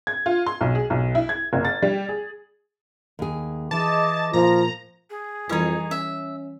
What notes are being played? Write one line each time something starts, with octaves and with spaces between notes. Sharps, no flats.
G#6
F4
C6
B1
G#4
B1
E4
G#6
F#1
A6
G3
G#4
D#2 G#4
E3 E4 G#4 D#5 A5 D6
A#2 F3 A#5
G#4
F2 E3 G3 D#4 E4 C#5
C#4 E5